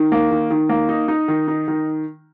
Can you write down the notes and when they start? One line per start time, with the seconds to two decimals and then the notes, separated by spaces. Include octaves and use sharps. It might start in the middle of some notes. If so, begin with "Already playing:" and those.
Already playing: D#3
0.12 A#3
0.31 D#3
0.50 D#3
0.69 A#3
0.89 D#4
1.08 D#4
1.28 D#3
1.48 D#4
1.68 D#3